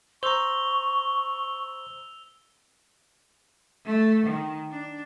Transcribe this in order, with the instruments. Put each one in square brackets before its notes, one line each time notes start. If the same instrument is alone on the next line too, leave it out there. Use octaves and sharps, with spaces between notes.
[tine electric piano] C5 A#5 [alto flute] C#6 [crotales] E6 F7 G7
[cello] A3
D#3
D4